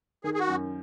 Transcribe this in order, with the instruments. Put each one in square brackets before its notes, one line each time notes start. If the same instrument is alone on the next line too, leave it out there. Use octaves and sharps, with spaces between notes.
[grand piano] D#3 [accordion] G#4
[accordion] G#4
F#4
[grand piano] F#2